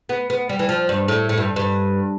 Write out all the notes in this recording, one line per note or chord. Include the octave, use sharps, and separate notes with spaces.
B3
B3
G3
E3
F3
G2
A2
A2
G2
G2